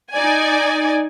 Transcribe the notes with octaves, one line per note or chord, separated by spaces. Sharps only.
D#4 D5 G#5